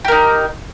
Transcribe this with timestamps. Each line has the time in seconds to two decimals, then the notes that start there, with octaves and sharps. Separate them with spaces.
0.05 G4
0.08 A#4
0.12 D#4